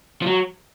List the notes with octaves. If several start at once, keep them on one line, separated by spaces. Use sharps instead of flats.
F3
F#3